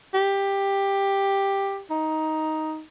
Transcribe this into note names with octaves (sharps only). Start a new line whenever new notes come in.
G4
D#4